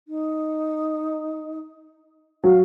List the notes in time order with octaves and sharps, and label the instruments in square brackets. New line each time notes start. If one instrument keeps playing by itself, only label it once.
[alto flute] D#4
[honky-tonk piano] F#3 [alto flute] F5